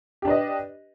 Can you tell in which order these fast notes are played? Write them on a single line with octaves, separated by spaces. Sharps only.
G4 D4 B4 D#5